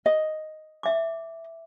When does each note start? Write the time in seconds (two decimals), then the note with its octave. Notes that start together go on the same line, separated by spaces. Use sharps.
0.06 D#5
0.83 E5 D6